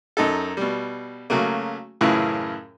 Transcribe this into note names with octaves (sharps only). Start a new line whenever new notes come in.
F#2 D#4 A4
B2 G3
C#3 F#3 A3 A#3
F#2 A2 C#3 E3 E4 F4